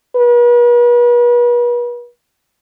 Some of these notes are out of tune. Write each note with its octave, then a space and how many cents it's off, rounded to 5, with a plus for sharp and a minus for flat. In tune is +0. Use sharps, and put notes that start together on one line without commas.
B4 -40